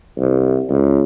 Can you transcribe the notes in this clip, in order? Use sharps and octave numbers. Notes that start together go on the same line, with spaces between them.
C2
C#2